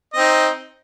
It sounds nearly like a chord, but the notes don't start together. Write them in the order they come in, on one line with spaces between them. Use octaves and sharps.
D#5 C4 D#4